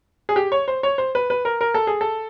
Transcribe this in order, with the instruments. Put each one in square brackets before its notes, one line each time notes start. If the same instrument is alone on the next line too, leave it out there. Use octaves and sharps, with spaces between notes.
[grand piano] G#4
G4
C#5
C5
C#5
C5
B4
B4
A#4
A#4
A4
G#4
A4